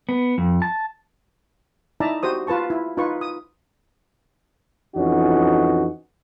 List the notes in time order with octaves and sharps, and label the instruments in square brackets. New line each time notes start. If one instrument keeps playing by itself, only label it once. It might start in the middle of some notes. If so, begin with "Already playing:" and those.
[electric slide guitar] B3
F2
A5
[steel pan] D#4 E4 D5 E5 A5 A#5
F#4 G4 C5 D#6
F4 B4 A5 C#6
E4
D#4 F4 B4 C#6
D#6
[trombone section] F2 E3 C#4 D#4 F#4